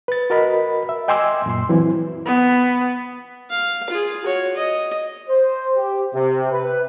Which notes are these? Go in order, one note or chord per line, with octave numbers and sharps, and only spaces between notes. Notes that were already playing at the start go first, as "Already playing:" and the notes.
B4 A6
F#4 A#4 D#5 B5
E5
D#5 G5 G#5 C6 D6 E6
F#2 A#2 C6
E3 F#3 C4 E4
B3
F5
F4 G#4
F#4 C#5
D#5
C5
G4
C3
B4